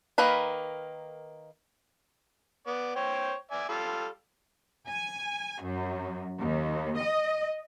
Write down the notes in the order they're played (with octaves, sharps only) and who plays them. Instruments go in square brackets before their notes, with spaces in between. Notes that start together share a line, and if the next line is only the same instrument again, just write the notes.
[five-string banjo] D#3 A#3 A#4 B4 B5
[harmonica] B3 D5
C5 C#5 G5
D5 E5 G#5
G3 F4 A4
[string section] G#5
F#2
D#2
D#5